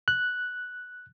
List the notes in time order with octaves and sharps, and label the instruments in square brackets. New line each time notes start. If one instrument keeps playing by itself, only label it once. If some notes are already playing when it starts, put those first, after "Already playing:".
[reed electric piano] F#6